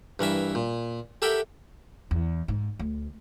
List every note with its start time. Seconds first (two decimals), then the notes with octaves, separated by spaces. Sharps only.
0.19 G2 E3 A#4 E5
0.55 A#2
1.22 G4 A4 A#4 E5 F#5 G5
2.11 E2
2.48 G#2
2.79 D2